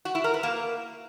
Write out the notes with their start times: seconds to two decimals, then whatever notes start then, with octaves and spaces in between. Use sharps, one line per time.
0.05 F#4
0.15 E4
0.24 A#4
0.34 B4
0.43 A#3